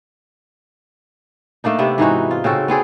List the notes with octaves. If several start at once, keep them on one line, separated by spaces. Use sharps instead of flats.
A3 A#3 D4 D#4
C3 B3 D4
G#2 E3 D#4 F#4
F4
C#3 C4 F#4 A4
B3 C4 G#4 D5